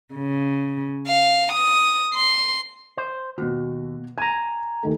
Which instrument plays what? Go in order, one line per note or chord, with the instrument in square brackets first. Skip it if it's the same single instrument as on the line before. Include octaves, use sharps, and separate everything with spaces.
[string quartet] C#3
F5
D#6
C6
[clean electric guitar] C5
[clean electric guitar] D#2 [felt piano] B2 F#4
[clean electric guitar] G#5 A#5 [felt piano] G#6
[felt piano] D#2 D#3 A3